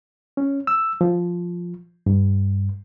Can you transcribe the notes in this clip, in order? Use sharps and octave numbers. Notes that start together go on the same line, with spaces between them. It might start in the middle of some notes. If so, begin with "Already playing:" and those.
C#4
E6
F3
G2